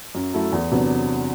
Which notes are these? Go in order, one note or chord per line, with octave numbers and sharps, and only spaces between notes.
F#2
F#3 A3 E4 A4
E2
C3 F#3 B3 D4